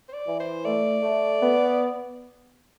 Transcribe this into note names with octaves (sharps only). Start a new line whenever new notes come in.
C5
D5
E3
C5
A3 D5
A3
B3